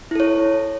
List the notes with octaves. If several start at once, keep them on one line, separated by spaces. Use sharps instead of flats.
E4 A4 C#5